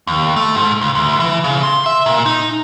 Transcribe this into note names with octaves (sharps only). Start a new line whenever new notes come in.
D#2
A3
G#2
C#2
D2
E3
C#3
C6
E5
A#2
D#4